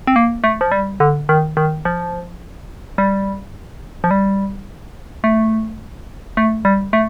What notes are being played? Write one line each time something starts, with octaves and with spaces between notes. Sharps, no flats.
C4
A#3
A3
F3
G3
D3
D#3
D#3
F3
G3
F3
G3
A3
A3
G3
A3